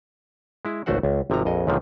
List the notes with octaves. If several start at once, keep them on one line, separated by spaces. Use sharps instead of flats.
G#3 E4
G#1 C#2 A3 F#4 C5 F#5
C#2
G#1 C3 F3 A#5
A#1 F2 D#5
C#2 A#2 D3 D#3 F3